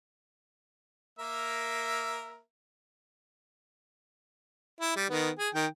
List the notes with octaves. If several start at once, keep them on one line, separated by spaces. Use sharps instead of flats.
A#3 A#4 E5
E4
G3
D#3 B3
G#4
D#3 G5